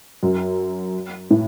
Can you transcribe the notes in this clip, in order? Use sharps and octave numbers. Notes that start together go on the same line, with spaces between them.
F#2
A2